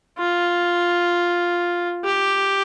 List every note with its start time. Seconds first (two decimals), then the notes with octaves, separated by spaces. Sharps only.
0.19 F4
2.05 G4